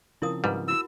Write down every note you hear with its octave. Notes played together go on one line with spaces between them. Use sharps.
C#3 F3 C4 E4 A#4 D#6
G#2 G3 B4 F#5
E4 F#4 E6